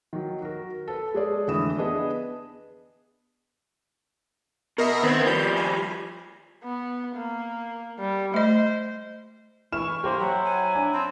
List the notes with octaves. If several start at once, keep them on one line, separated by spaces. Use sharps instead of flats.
D#3 F#3
F#4 A#4
A4 B4
G#3 G#4 D5
F1 D3 E3 E4 D#6 E7
B3 D4 G#4 B4 D#5
B2 A#4 D#5 E5
D#3 B3 C4 B4 G#6
F3 G3 C6 G6
G#5
B3
A#3
G3
A3 C5 D#5
E3 E4 C#6 F6 E7
A#3 G4 C5 G5
F#3 E4 F#5
G#5
D4
C4 A5